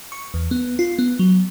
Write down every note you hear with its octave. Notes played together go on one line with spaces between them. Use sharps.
C#6
E2
B3
F4
B3
F#3